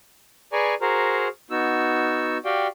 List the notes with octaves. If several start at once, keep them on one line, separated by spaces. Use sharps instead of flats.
G#4 B4 D5 G#5 A#5 C#6
F#4 G#4 A#4 C5 A#5
B3 D#4 F#4 E6
F#4 G4 D5 F5 G5